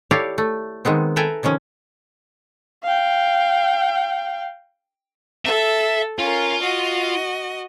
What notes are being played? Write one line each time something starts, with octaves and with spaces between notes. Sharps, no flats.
E4 G4 A4 C#5 D5 F5
A3
D#3 G#3 B3 C4
A4 B4 E5 G5 G#5 A#5
C3 D#3 F3 C#4
F5 G5
A4 E5
C#4 F4 A#4
F#4 D#5